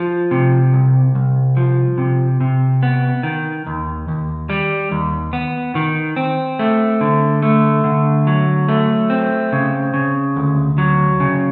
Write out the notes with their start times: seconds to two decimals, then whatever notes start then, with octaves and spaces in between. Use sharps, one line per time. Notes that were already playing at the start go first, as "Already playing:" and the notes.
Already playing: F3
0.31 C3
0.73 C2
1.15 C2
1.57 F3
1.98 C3
2.41 C3
2.83 B3
3.23 D#3
3.66 D#2
4.08 D#2
4.50 G3
4.91 D#2
5.33 B3
5.75 D#3
6.16 C4
6.59 A3
7.01 D3
7.42 A3
7.84 D3
8.27 F#3
8.68 A3
9.10 C4
9.52 C#3
9.94 C#3
10.36 D2
10.78 F#3
11.20 C#3